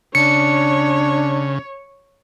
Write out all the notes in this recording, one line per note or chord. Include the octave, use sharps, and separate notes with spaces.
C#3 D4 C#5 C#7